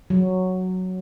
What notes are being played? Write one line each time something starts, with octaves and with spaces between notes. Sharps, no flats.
F#3